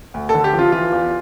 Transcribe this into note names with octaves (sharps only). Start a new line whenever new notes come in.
D2
A4
D3
G4
F3
F4
E3 F4
E2